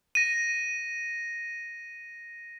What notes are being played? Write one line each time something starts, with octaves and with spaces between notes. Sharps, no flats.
A#6 D#7